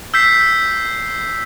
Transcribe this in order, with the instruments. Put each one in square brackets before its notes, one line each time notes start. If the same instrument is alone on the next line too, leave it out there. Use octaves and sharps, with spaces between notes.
[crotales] E6 G6 B6 C7